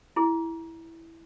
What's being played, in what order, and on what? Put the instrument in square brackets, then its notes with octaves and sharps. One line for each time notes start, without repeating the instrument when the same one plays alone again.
[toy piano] E4 G#4